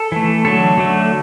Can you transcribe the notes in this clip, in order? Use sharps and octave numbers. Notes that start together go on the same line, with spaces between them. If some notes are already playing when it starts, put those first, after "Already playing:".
Already playing: A4
E3 A3
D3 F#3 A3 A4
D3 F#3 A3